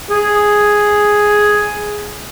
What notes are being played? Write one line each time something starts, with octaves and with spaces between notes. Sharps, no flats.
G#4